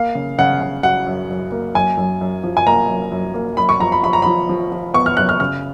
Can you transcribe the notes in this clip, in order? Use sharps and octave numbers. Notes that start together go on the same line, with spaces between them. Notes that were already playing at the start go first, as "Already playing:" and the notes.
Already playing: A#3 F5
C#3
C#3 F#5
C#3
F#3 F#5
F#2
F#2
A#3
F#2 G#5
F#2
F#2
F3
G#5
A#3 A#5
F#2
F#2
A#3
F#2 B5
C#6
F3 A#5
B5
F3 B5
A#5
F3 B5
F3
F3
B3 C#6
F6
F#2 F#6
F6
C#3 F6